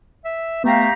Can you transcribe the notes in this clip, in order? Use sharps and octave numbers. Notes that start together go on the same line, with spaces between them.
E5
A3 B3 G4 F5 G5 A#5